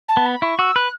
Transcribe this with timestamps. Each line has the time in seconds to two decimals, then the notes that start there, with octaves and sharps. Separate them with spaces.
0.08 A5
0.17 B3
0.25 B5
0.42 E4 C#6
0.59 F#4 E6
0.76 B4 F#6